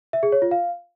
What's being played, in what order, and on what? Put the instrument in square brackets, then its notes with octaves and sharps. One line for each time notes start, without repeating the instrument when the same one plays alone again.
[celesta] E5
G#4
C#5
F4
F5